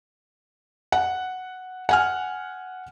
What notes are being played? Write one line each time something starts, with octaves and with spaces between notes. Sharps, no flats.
F#5
F#5 G#5 F6